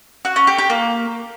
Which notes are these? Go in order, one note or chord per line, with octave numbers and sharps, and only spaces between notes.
F#4
C#4
G4
G4
A#3